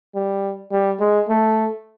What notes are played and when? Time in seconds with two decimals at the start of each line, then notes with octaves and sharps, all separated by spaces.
0.15 G3
0.72 G3
1.00 G#3
1.29 A3